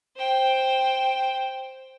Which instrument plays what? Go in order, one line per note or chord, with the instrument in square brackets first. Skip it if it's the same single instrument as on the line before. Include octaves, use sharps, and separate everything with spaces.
[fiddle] C5 G5